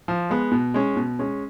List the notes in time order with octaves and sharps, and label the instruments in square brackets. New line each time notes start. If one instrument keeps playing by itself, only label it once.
[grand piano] F3
G#3 B3
B2
G#3 C#4
B2
G#3 C#4